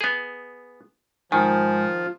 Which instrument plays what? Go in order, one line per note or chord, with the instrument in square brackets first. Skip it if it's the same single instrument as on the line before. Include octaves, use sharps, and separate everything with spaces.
[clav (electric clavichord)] B3 G#4
[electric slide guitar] G#2 G#5 [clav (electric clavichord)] D#3 [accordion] F3